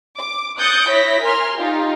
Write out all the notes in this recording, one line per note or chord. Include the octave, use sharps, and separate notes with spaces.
D6
D#6 F#6 G6 A6 C#7 D7
E4 C#5 A#6 B6
A#4 G#5 C6 F6
D#4 F4 G4